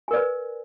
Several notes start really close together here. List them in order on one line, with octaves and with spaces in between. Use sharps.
G#5 A#4 D5 B4